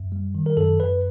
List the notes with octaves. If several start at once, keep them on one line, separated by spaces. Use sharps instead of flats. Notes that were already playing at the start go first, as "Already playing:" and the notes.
Already playing: F#2
G3
D#3
A#4
F#2 A4
F#2 B4